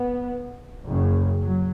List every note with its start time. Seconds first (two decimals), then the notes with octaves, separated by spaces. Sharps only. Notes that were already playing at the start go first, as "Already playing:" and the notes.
Already playing: B3
0.87 F#1 F#2 C#3
1.41 F#3